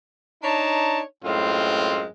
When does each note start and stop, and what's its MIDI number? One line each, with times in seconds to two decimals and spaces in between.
0.43 1.02 62
0.43 1.02 63
0.43 1.02 73
0.43 1.02 81
0.43 1.02 82
1.24 2.06 42
1.24 2.06 45
1.24 2.06 56
1.24 2.06 60
1.24 2.06 65